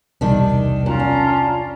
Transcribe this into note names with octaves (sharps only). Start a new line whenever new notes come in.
E1 C2 D#3 G3 D4
F#2 C#4 F4 A#5
D4